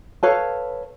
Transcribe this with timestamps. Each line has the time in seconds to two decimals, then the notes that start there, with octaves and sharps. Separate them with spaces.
0.23 A4 B4 C#5 F5